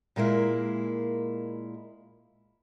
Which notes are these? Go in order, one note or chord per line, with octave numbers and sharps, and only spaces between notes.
A#2 G#3 A#3 E4